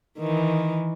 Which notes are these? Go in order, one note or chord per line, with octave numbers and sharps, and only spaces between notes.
D#3 E3